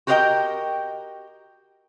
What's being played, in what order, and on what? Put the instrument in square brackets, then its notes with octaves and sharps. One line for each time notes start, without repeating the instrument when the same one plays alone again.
[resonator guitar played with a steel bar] F#4 G4 A#4 B4 D#5 G5